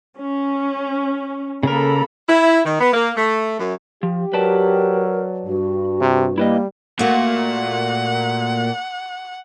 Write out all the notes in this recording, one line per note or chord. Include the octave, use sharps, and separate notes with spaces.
C#4
C#3 A#3 A4 A#4 B5
E4
D#3
B3
A#3
A3
F#2
F3 G4
F#3 A#4 B4 D5 A5
G2 F#4
C3
G3 A#3 E4 B4 D#5
A#2 A3 A#3 F#4 F#5